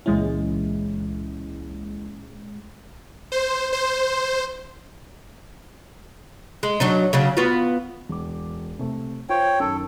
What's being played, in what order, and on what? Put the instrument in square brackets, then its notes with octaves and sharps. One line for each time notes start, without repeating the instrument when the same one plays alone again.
[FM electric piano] C#2 E3 E4 [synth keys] A#2 G#3 C#4
[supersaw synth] C5
C5
[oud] G#3
F#3 D4 D#4
C#3 F#3 D4
B3 F4 F#4
[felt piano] E1 D6
C3 A3
[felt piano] F4 C5 [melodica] C#5 G5
[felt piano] F#2 D#3 [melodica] A4